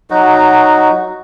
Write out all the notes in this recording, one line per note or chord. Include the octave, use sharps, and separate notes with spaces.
F#3 D#4 F#4